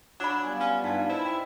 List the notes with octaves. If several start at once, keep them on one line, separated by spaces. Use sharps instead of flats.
F#3 D4 B5
G3 B3 F4 G#5 G#6
C#4
G2 D#4 A5 B6
E4 C5 D#5
G5 C6